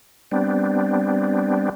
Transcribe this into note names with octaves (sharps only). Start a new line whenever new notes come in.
G3 B3 C4 D4